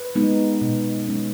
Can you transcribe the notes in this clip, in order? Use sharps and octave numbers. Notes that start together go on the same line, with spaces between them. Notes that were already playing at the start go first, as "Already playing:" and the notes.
Already playing: B4
G#3 B3 D#4
B2
G#3 C#4